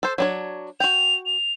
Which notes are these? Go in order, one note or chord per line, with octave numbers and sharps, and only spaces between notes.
A4 C5
F#3 D4 C#5
F#4 G5 F7
F7